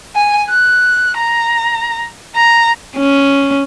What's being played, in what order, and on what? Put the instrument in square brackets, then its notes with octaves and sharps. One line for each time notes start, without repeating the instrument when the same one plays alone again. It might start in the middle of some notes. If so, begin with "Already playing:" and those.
[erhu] G#5
F#6
A#5
A#5
[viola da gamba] C#4